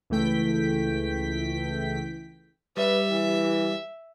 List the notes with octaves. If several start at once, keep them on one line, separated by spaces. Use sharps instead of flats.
C#2 E3 A3 G5 B6
G3 B4 E5
E3